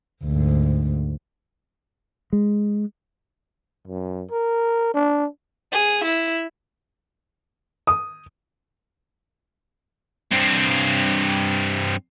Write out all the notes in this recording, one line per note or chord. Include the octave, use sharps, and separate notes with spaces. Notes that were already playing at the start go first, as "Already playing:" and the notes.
D2 G#2
G#3
F#2
A#4
D4
G#4
E4
D#6
G2 C4